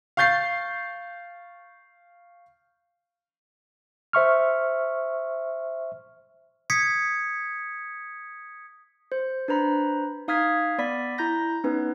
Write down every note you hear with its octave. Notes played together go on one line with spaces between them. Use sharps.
F5 C#6 G6 A6 C7
C5 E5 C#6 F6
D#6 G#6 B6 C#7
C5
D4 B4 C5 A#5 B5
D#4 F5 D#6 F6 G#6 B6
B3 D5 B5 B6
E4 A#5 G6 A#6
B3 C#4 D#4 B4